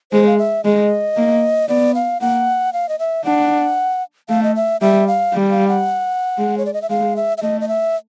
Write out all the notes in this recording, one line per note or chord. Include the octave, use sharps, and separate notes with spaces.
G#3 C5
F5
E5
G#3 D#5
A#3
B3 D5
F5
A#3 F#5
F5
D#5
E5
D4 F#5
A3 F5
D#5
E5
G3 E5
F5
G3
F5
F#5
G#3
C#5
D5
D#5
E5
G#3 F5
E5
E5
A3 D#5
D#5
E5